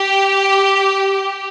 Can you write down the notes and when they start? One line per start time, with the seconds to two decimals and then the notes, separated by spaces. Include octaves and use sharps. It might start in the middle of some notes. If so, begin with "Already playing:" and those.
Already playing: G4